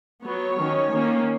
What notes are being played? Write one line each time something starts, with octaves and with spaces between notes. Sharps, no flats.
F#3 B3 C#5
D#3 F#3 C#4
D#3 A#3 C#4